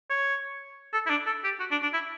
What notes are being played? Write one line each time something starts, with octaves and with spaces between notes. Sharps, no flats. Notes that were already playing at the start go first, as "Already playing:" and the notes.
C#5
A4
E4
D4
A4
G4
F#4
D4
D4
E4